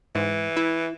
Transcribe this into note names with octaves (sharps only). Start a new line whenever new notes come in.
G#2 E3
E4